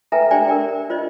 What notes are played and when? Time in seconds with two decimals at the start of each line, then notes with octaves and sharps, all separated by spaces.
0.12 A4 B4 E5 G5 G#5 A#5
0.31 D4 G4 C5 D5 G5 G#5
0.47 A#4 D5 G5
0.90 F4 C5 D5 D#5